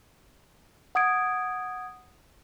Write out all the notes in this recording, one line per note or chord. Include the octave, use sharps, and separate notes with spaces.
F#5 D#6 G#6 D7